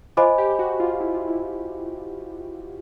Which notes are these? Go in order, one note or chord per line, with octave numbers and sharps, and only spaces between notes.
F4 C5 D#5 G#5 B5 D6
G4
G4
F#4
F#4
F4
E4
F4
E4